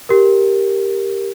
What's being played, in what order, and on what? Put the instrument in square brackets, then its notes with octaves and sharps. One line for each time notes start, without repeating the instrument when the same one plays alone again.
[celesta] G4 A#4